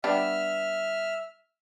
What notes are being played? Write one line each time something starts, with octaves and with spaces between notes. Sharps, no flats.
G3 B3 D4 E5 F6